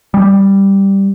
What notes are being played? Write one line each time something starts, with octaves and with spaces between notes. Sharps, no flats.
G3